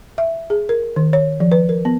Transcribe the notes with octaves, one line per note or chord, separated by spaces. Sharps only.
E5
G#4
A#4
D#3
C#5
F3
B4
A#4
B3